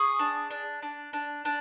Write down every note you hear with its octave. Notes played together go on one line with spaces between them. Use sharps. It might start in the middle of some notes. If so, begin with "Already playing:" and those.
Already playing: G#4 C#6 D#6
D4
D4
D4
D4
D4